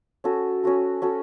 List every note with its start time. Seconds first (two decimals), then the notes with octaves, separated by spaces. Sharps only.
0.24 C#4 F#4 A4
0.63 C#4 F#4 A4
1.02 C#4 F#4 A4